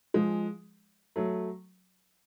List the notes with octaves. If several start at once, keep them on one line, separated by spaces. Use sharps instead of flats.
F3 G#3
F#3 A3